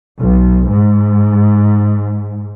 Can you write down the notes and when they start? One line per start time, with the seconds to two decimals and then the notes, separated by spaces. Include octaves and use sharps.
0.21 B1
0.70 G#2